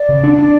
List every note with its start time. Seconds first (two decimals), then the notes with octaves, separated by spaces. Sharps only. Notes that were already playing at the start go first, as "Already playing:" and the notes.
Already playing: D5
0.09 C#3
0.24 D4
0.39 D4